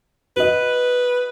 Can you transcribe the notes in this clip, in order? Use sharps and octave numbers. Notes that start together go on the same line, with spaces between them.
F#4 B4 D#5